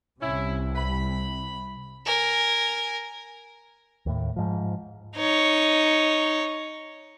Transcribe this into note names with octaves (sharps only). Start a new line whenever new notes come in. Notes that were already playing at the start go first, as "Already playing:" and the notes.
C2 C3 C#4 E4
B5
A#4 G#5
D#2 A2
G#2 F3
D#4 C#5